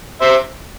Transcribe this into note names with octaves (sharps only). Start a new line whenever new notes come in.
C5 E5